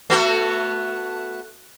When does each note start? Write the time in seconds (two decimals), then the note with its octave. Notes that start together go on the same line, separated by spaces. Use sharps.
0.10 A3 B3 F#4